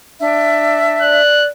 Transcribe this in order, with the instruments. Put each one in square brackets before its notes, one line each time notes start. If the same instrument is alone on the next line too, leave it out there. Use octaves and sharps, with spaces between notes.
[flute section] D4 E5
[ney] D5 [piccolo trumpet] F#6